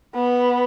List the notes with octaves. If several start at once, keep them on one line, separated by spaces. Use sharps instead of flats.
B3